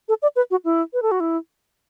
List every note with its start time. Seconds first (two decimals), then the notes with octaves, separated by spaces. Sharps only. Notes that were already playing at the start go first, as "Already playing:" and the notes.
0.09 A4
0.22 D5
0.36 B4
0.51 F#4
0.65 E4
0.93 B4
1.02 A4
1.11 F#4
1.20 E4